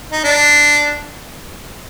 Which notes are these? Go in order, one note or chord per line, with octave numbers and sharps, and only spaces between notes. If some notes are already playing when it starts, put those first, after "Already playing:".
D#4
D4